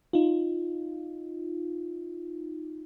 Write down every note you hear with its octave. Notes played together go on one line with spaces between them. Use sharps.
D#4 F4